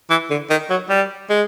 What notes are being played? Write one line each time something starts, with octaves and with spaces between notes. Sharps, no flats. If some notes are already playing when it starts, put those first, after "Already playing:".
E3
D3
D#3
F#3
G3
G#3